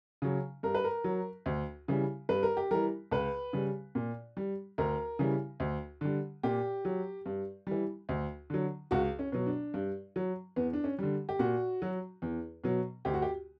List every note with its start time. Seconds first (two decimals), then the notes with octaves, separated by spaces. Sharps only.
0.22 C#3 F#3
0.63 G2 A#4
0.75 B4
0.84 A#4
1.04 F#3
1.46 D2
1.88 C#3 E3 G3
2.29 G2 B4
2.43 A#4
2.57 G4
2.71 E3 G3 A#4
3.11 C#2 B4
3.53 C#3 G3
3.95 A#2
4.37 G3
4.78 D2 A#4
5.19 C#3 E3 G3
5.60 D2
6.01 D3 G3
6.43 A#2 G4
6.85 F#3
7.26 G2
7.67 E3 G3
8.09 D2
8.50 D3 F#3
8.91 C#2 F#4
9.19 C#4
9.32 B2 F#3
9.46 D4
9.74 G2
10.16 F#3
10.56 E2 B3
10.73 D4
10.84 C#4
10.99 D3 G3
11.29 G4
11.39 A#2 F#4
11.82 F#3
12.22 E2
12.64 B2 F#3
13.05 D2 G4
13.14 F#4
13.22 G4